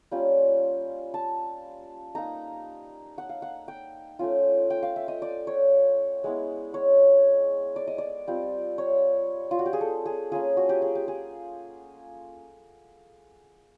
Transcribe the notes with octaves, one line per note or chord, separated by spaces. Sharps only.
G3 A#3 C#4 F4
A5
A#3 D#4 A#5
F#5
F5
F#5
G5
A3 C#4 F4
G5
F5
E5
D#5
D5
C#5
G#3 B3 E4
C#5
D5
D#5
D5
G3 C4 F4
C#5
F4
F#4
G4
G#4
A4
G#4
A#3 C#4 F4 G#4
F#4
G4
G#4
G4
G#4